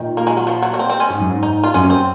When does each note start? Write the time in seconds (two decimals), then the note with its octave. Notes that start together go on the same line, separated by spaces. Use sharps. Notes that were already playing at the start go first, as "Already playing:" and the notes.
Already playing: A#2 D#3
0.17 A#3
0.27 G#3
0.37 F#3
0.47 F3
0.62 F#3
0.74 A#3
0.79 C4
0.90 C4
1.00 C#4
1.10 G#2
1.20 F#2
1.30 G#2
1.43 D#4
1.64 F4
1.74 F#2 C#4
1.84 F#2
1.90 C4